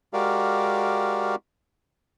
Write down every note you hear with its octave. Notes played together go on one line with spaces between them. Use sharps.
G#3 F#4 G4 A#4 D5 F5